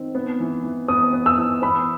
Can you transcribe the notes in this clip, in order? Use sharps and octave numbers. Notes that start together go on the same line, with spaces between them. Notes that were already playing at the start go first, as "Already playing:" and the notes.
Already playing: D#3 C4
B3
E3
E3
B3 D#6
B3
E6
E3
B3 B5